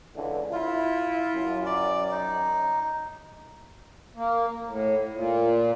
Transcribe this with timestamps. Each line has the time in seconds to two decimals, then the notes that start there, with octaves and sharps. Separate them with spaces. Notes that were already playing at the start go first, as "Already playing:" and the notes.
0.16 C#2 D3 E3
0.53 E4 F4
1.35 F#2
1.66 D5
2.11 D#4
4.16 A#3
4.66 A2
5.13 A#2